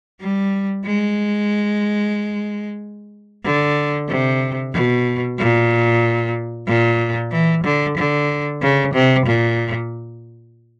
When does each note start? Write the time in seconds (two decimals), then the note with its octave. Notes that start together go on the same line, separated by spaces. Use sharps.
0.21 G3
0.85 G#3
3.44 D3
4.09 C3
4.74 B2
5.39 A#2
6.67 A#2
7.32 E3
7.64 D3
7.97 D3
8.62 C#3
8.94 C3
9.26 A#2